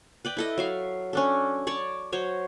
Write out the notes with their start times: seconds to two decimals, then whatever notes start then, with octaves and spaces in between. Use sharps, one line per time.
0.25 B4 D5 G5
0.37 E4 A4 D#5
0.58 F#3 E5 F5
1.13 C#4 D4 A4
1.67 C#5 D5 A5 C#6
2.12 F#3 C5 C#5